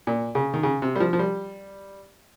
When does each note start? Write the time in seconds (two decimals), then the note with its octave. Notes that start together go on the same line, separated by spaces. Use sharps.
0.07 A#2
0.35 C#3
0.54 D#3
0.63 C#3
0.82 C3
0.96 G3
1.00 F3
1.13 F3
1.19 G3